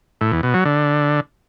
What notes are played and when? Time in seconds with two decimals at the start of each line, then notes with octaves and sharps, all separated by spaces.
0.21 A2
0.32 E2
0.43 B2
0.54 F#3
0.65 D3